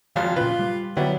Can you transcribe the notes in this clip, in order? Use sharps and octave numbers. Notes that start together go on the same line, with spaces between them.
G#1 F2 F3 F5
A#2 C#3 F4 B4
G3
D3 F#3 G3 B3 E4